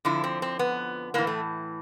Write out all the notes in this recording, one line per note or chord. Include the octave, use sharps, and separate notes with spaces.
F2 D3 F3 E4
C4
C4
B3
A2 E3 A#3
A3